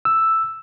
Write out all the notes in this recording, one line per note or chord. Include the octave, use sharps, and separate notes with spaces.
E6